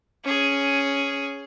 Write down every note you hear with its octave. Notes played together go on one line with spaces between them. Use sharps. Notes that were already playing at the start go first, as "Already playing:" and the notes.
C#4 G#4